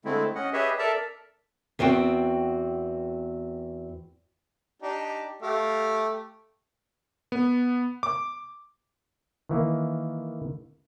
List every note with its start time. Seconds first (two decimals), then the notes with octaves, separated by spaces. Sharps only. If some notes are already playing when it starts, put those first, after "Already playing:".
0.05 D3 G#3 A3 C4 E4
0.35 C#4 D#5 F#5
0.53 G4 G#4 B4 C#5 D#5 E5
0.79 A4 A#4 D5 E5 A5 A#5
1.79 E2 B3 C4 F#4 G5
4.82 D4 D#4 G4
5.43 A3 G4 F5
7.32 B3
8.03 D6
9.49 D#3 E3 A#3